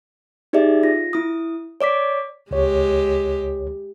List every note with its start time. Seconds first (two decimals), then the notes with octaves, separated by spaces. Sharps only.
0.53 D#4 G4 G#4 D5 E5
0.83 F4 A#6
1.13 E4 D#6
1.81 C#5 D5 D6 B6
2.51 C#2 G#3 G4 C#5